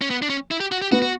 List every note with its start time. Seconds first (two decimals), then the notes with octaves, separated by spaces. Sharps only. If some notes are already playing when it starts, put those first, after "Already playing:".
0.01 C#4
0.10 B3
0.22 D4
0.30 C#4
0.51 E4
0.60 G4
0.72 F#4
0.82 G4
0.92 B3 F#4
1.02 F#4